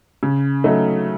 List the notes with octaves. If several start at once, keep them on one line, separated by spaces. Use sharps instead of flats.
C#3
F#3 A3 D#4